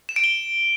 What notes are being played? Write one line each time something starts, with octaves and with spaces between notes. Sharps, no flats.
E7
D7
G7